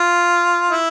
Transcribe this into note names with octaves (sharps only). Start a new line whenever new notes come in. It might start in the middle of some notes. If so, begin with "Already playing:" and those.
Already playing: F4
E4